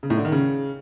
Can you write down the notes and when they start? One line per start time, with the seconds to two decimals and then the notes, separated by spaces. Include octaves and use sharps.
0.03 C#3
0.10 A2
0.17 D3
0.25 D#3
0.32 C#3